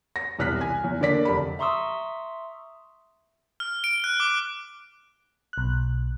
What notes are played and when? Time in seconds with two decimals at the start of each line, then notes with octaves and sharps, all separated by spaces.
0.16 A#6
0.39 E1 C2 F6 F#6 B6
0.61 G#5
0.84 E2
1.01 D3 A#3 D5 B6
1.25 F1 G4 B5
1.59 E5 A#5 C6 C#6 D#6 E6
3.60 F6
3.84 D7
4.04 F#6
4.20 D6
5.53 B1 F#6